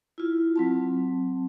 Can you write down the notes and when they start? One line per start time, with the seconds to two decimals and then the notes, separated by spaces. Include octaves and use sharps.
0.18 E4 F4
0.56 F#3 C4 A5